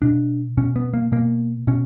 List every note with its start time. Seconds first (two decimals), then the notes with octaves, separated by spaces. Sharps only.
0.02 B2 D4
0.57 B2 C#4
0.76 B3
0.94 A#3
1.12 B2 A#3
1.67 B2 C#4